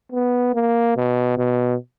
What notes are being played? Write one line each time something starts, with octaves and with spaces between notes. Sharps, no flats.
B3
A#3
B2
B2